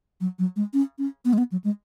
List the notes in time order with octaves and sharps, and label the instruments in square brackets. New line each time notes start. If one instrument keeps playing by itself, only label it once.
[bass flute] F#3
F#3
G#3
C#4
C#4
B3
G#3
B3
F#3
G#3